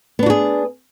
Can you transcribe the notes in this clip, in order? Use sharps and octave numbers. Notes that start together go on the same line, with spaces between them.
B3 D4 F#4 G#4